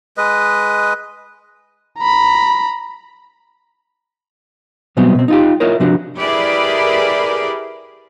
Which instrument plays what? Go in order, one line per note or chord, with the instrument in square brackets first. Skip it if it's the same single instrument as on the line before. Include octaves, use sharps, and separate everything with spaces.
[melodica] G#3 B4 D#5
[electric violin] A#5 B5
[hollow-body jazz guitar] B2 E3 F#3 G3 B3 C4
B2 C4
D#4 F4 G4
E4 F4 A#4 C#5 D#5
C3 F3 D4 F#4
[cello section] E4 G4 G#4 A#4 B4 D5